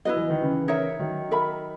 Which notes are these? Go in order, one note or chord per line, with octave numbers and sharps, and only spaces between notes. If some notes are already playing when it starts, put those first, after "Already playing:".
F#3 E4 B4 D#5
E3
D#3
C#3 E3
D#4 A#4 C#5 E5
D#3 F#3
A#4 E5 B5